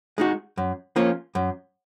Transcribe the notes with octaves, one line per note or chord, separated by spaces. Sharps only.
G#3 D#4 F#4
F#2
F3 A#3 C#4 F4
F#2